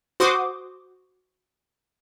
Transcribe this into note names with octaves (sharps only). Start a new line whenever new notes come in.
F#4 C5 C6 D6 D#6